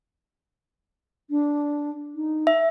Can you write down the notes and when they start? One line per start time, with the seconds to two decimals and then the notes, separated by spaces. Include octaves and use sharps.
1.30 D4
2.15 D#4
2.47 E5